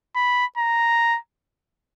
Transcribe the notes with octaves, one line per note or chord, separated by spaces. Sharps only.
B5
A#5